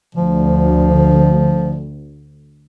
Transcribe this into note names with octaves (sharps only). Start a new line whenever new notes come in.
D2 F3